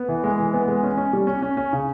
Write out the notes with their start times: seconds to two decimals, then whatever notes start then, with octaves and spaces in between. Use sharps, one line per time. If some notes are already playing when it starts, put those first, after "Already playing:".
Already playing: B3
0.09 E3
0.24 G#3
0.39 E3
0.54 B3
0.68 G#3
0.83 C#4
0.97 C#4
1.13 G3
1.27 C#4
1.42 C#4
1.57 C#4
1.73 C#3